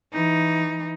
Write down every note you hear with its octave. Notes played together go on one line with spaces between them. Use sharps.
E3 D#4